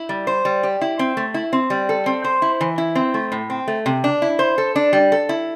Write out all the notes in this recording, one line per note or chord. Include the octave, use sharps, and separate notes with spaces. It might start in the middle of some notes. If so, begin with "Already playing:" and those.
Already playing: E4
G3
C5
G3
G4
E4
C4
A3
E4
C4
G3
A4
C4
C5
E4
E3
E4
C4
A3
A2
C4
A3
C3
D4
E4
C5
A4
D4
G3
A4
E4